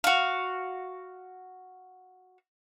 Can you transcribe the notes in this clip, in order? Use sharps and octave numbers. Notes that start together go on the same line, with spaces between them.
F#4 F5